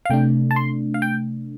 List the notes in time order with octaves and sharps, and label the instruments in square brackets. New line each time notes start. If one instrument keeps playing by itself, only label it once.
[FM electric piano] F5
C3 A3 D4 G5
A5
C6
F5
G5